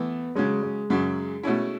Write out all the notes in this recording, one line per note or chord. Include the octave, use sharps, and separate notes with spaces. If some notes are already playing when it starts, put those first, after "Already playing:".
Already playing: E3 A3 B3
C#3 F#3 G#3 C#4
G#3
F#2 C#3 F#3
B2 A3 C#4 E4